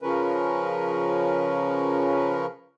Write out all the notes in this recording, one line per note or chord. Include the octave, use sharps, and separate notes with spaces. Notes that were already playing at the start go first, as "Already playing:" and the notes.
C#3 F3 C#4 A#4 B4